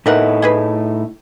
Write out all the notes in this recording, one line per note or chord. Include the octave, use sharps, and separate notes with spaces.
A2 E3 A3 D#4 A#4 F#5
E4 G#4 B4